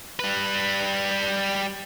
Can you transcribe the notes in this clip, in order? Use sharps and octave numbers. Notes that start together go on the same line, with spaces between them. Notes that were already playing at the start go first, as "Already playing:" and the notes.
G3 B4